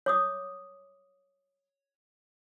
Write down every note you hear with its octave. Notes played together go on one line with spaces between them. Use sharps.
C#5 D6 D#6